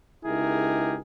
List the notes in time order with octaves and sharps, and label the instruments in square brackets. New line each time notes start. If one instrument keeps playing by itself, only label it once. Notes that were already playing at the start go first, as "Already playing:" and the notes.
[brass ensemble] C#2 D#4 E4 G4 G#4 A#4